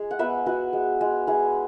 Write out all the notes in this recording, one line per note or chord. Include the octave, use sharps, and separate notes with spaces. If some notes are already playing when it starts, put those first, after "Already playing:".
Already playing: G#3 G#4
F#5
B3 B4 E5
E4 F#4 B4
G#3
G#3
E4 G#4